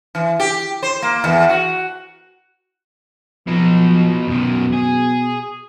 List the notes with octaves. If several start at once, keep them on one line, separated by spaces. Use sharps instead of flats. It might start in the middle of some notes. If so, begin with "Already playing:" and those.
E3
G4
C5
A#3
E2
F#4
B2 F3 D#4
F#2 B2 D#3
G#4